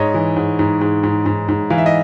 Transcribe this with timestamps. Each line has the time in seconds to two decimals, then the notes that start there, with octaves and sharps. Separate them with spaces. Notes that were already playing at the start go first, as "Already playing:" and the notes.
Already playing: G#2 C#5 D#5
0.14 E3
0.37 G#2
0.59 G#2
0.81 G#2
1.04 G#2
1.26 G#2
1.49 G#2
1.70 E3 F5
1.78 E5
1.86 D#5